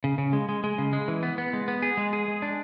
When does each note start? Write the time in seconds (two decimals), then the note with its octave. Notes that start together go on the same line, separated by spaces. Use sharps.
0.04 C#3
0.18 C#3
0.33 G#3
0.49 G#3
0.64 G#3
0.78 C#3
0.93 G#3
1.08 E3
1.23 B3
1.38 B3
1.53 G#3
1.68 B3
1.82 G#4
1.97 G#3
2.13 G#4
2.28 G#3
2.42 D4